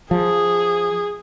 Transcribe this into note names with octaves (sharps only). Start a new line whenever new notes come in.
F3 G#4